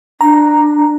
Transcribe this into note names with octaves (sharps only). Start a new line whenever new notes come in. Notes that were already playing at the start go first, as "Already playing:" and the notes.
D4 A#5